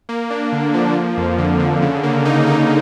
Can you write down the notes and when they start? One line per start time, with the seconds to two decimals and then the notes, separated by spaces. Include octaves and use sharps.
0.09 A#3
0.30 D4
0.52 D3
0.74 F3
0.95 A#3
1.17 F2
1.38 D3
1.59 D3
1.82 C#3
2.03 A#3
2.25 D#4
2.47 D#4